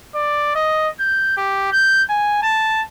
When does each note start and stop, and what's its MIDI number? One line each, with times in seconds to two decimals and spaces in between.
0.15 0.53 74
0.55 0.88 75
0.99 1.32 91
1.37 1.70 67
1.72 2.02 91
2.09 2.39 80
2.43 2.81 81